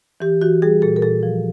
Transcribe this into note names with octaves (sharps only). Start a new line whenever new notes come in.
E3 G4
E3 F#4
G3 G#4
A#2 A4
A#4
A#2 A4
F3